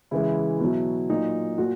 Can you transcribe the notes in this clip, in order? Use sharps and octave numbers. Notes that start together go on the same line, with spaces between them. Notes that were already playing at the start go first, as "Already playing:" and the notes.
C#3 E3 G#3 E4
B2 F#3
A#2 F#3 D#4
A#2 F#4